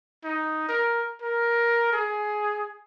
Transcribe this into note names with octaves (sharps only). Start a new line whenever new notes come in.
D#4
A#4
A#4
G#4